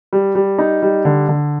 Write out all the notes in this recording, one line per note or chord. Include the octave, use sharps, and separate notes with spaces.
G3
G3
D#4
G3
D3
D3